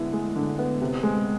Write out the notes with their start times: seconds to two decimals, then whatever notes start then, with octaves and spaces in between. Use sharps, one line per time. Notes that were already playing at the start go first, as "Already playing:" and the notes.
Already playing: D3 G#3 B3 E4
0.13 G#3
0.36 D3
0.59 B3
0.81 C3
1.03 G#3